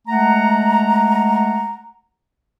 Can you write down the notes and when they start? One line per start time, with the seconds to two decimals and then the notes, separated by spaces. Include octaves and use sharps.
0.08 G#3 A3 F#5 A#5